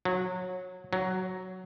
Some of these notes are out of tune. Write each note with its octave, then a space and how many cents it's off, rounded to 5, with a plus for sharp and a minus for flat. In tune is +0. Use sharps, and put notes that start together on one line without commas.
F#3 -20
F#3 +5